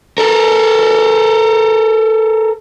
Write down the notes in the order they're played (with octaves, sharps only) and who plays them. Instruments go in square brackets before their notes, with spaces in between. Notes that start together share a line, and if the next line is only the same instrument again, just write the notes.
[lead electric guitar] A4 A#4